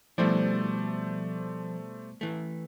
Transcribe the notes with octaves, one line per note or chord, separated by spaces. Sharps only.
B2 F3 G3 A3 E4 C5 D5
E3 A3